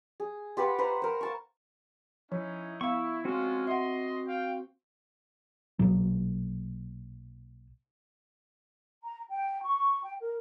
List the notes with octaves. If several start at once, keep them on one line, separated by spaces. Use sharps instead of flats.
G#4
F4 G4 B4 F#5
B4 C5 F#5 A#5
A#4 C5
F5 A5 C#6
F3 C#4 D#4 E4
B3 E4 F5 C#6
G#3 C4 C#4 F4 F#4
D#5 E5 F#5 C6
F5 G5
B1 A#2 F#3
A#5
G5
C#6
G5
A#4